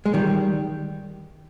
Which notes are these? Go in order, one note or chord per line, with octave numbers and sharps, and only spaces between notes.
G#3
D#3 G3